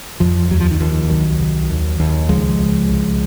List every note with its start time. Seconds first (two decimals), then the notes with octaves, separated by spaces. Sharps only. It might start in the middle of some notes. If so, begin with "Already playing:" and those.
0.20 F2 F3
0.51 D#2 F#3
0.60 F3
0.71 D#3
0.80 D#2 F3
1.10 C2 D#3 F#3
1.40 C2
1.70 D#2
2.00 D#2
2.29 C#2 F3 G#3
2.59 C#2
2.89 C2